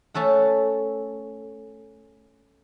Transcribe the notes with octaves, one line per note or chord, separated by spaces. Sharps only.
A3 C#4 A4 F#5